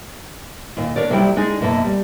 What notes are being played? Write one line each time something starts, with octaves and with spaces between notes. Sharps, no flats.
D#2 A#2
D4 A#4 C#5 D5
C3 F#3 G3 E4 G5
G#3 D4 D#4 G#4
F#2 B2 A#3 E5 A5
G3